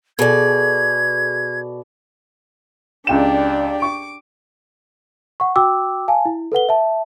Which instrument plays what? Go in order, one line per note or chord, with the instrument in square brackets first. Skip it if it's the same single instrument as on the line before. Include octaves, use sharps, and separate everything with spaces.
[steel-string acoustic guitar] B2 D5 [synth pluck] G#4 A4 [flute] G#6
[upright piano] C#2 G5 E7 [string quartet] D4 G4 D5
[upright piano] C#6 [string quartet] D6
[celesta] F#5 C#6
F#4 G5 D6 E6
F5 G#5 A5
E4
A4 B4 F#5 G7
E5 A5